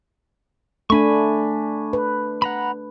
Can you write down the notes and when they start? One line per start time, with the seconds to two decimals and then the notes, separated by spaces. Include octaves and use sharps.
0.90 A3 D4 G#5 B5 C#6
1.93 B4
2.42 F#5 A#5 B5